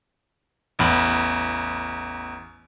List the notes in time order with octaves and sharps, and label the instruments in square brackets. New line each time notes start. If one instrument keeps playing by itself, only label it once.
[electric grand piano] A1 E2 B5